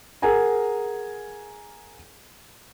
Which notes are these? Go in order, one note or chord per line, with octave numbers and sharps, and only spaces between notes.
G#4 A#4 F#5 G#5 A#5